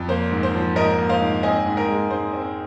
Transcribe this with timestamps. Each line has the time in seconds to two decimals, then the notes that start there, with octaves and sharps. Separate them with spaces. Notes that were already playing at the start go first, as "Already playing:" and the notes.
Already playing: F2
0.09 A#3 C5
0.31 G#2
0.43 C5
0.54 F3
0.76 G#2 A#4 D#5
0.99 A#3
1.09 C5 F5
1.21 G#2
1.43 C4 D#5 G#5
1.66 G#2
1.77 A#4
1.88 G#3
2.11 G#2 C5
2.34 C4